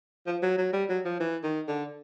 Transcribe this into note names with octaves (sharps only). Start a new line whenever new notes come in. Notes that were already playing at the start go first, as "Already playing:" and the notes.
F3
F#3
F#3
G3
F#3
F3
E3
D#3
D3